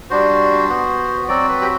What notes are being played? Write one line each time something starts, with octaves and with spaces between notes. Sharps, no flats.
G3 D4 F#4 C5
B3 F#4
F#3 C4 F#4 D5
B4
G4